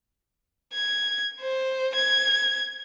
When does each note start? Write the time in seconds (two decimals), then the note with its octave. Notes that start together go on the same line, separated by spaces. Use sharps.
0.73 G#6
1.41 C5
1.95 G#6